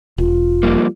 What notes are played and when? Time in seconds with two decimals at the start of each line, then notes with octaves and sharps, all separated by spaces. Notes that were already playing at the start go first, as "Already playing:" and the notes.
0.18 E1 F4
0.63 F2 G3 A#3